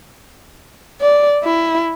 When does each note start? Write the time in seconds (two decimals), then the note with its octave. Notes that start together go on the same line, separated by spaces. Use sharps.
1.01 D5
1.43 E4